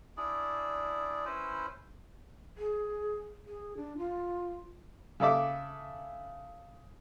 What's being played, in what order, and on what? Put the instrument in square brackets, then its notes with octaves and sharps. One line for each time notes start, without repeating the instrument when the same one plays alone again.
[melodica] D4 E4 G#4 D5
C#4 E4 B4 C5
[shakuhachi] G#4
G#4
D4
F4
[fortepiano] C#3 A4 E5 D6